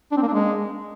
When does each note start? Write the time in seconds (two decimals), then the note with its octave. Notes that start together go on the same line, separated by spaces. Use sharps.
0.12 D4
0.17 C4
0.22 A#3
0.28 D4
0.33 G#3